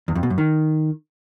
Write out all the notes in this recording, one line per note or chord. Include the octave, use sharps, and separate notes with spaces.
E2
F2
B2
F#2
D#3